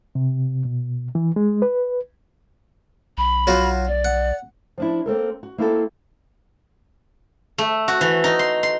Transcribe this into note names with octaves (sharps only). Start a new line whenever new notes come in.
C3
B2
E3
G#3
B4
B1 B5
F#3 F4 F#4
D5
F#5
F3 D4 E4
A#3 C4 A4 A#4
F#4
A#3 C4 E4 F#4 G4 A4
A3
F#4
E3
D#4
C6
C6